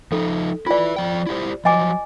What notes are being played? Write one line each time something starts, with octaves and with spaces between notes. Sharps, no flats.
F3 D#4 A4
E4 F4 B4 D5
F3 G5
E4 G4 C5
F3 F#3 D#5 G#5 D6